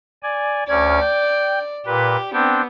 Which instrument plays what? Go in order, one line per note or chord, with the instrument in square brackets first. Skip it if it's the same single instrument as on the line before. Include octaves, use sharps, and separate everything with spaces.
[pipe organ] D5 G#5
[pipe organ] D2 C#4 G#6 [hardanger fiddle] D5
[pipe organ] G5
[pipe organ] A#2 B4 [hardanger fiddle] G4
[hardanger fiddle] B3 [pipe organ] C4 D4 G5